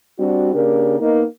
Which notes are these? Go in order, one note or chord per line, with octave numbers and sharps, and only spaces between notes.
G3 C4 D4 F#4
C#3 A#3 D4 G4 A#4
A#3 B3 D#4